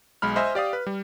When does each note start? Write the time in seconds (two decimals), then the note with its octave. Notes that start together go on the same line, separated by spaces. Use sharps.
0.22 B1 G#3 B5 F6
0.36 C5 D#5 E5 G#5
0.55 G4 D5 F5 D#6
0.73 B4
0.87 G3